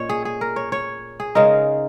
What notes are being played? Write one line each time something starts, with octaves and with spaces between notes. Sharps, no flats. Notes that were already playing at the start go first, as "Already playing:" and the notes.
Already playing: A#2 C#4 C#5 D#5
G#4
G#4
A#4
C#5
C#5
G#4
C#3 G#3 D#4 A#4